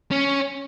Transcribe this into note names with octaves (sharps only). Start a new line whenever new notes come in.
C#4